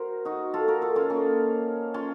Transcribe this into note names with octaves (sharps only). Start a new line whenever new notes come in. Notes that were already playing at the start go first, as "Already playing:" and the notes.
Already playing: F#4 A#4 C5
D#4 F#4
F4 A4
F#4 A#4
F4 A4
C#4 F4
A#3 C#4
C#4 F4